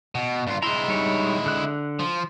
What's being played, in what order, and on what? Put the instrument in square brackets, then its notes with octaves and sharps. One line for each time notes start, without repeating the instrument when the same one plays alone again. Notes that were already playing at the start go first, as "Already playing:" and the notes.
[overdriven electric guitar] B2
G2 F4
[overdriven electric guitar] G#3 E4 [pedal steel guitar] A#5 C6
[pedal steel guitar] G3 D#4 C#5
D3 F#6
[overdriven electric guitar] F3